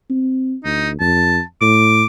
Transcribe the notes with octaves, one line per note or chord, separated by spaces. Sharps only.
C4
D2 D#4
F2 A5
A2 D6